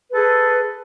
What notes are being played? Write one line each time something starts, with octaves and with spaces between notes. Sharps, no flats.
G#4 A4 B4